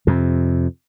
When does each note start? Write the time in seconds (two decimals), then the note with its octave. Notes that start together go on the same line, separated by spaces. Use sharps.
0.07 F2 C3